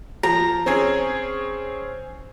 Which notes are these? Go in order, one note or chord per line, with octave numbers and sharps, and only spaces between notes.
F3 A#5
C4 C#4 G#4